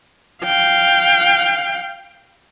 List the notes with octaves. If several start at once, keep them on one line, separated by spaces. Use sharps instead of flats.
F5 G5